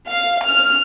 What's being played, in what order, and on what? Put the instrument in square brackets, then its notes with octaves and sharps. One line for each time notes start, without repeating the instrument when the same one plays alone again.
[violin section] F5
F6